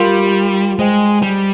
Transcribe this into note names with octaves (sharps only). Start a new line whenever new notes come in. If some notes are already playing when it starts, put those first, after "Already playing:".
Already playing: G3 F4 A#4 F5 C6
G#3 C5 D#5 G5
G3